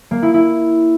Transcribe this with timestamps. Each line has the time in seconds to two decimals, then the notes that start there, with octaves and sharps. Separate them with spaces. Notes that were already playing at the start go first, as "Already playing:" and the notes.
0.11 A#3
0.22 E4
0.34 E4